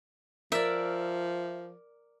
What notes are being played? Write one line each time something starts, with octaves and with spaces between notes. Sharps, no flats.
F3 A#4 D5 E5